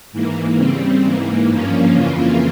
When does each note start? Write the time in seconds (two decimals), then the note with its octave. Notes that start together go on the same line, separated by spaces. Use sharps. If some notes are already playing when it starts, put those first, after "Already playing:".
0.12 G#2 E3 A#3
0.57 C#3 G3 C4
1.03 G#2 E3 A#3
1.48 G2 F3 A#3 C#4
1.93 F2 C#3 E3 A#3 F4